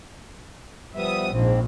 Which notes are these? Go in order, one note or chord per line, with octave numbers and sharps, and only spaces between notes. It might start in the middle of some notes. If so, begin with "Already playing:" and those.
F3 G3 B3 E5 D#6
A#1 G#2 F3 C4